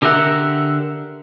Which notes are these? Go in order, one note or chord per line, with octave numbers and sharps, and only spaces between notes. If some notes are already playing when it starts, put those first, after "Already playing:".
D3 G4 A#4 E5 F#5